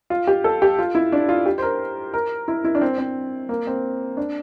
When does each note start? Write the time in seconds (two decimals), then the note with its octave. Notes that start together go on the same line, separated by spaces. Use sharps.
0.10 F4
0.27 G4
0.44 A4
0.62 G4
0.79 F4
0.95 E4
1.12 D4
1.29 F4
1.46 G4
1.58 C5
1.62 A#4
2.14 A#4
2.48 E4
2.64 E4
2.75 D4
2.81 C4
2.98 C4
3.49 A#3
3.67 C4
4.17 D4